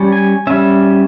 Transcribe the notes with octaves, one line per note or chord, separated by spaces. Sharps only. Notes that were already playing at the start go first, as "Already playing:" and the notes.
Already playing: G3 C#4
G#5
G3 C#4 E5